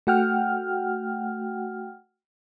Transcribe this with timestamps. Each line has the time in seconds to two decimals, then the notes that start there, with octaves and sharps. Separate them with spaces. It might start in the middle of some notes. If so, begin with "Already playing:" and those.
0.07 A3 F#4 F#5 G5 F6